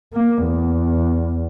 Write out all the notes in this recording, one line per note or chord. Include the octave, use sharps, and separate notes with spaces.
A#3
E2